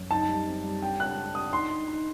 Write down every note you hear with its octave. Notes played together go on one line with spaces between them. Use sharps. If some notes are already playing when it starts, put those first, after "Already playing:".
Already playing: F#2
D#4 A5
G3
C4
G3
D4 G5
D4 F#6
D4
D4 D#6
D#4 C6
D#4
D#4